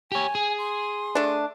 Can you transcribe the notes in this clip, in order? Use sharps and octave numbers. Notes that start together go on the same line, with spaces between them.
G4 C#5 G#5
G#4
C6
A3 D4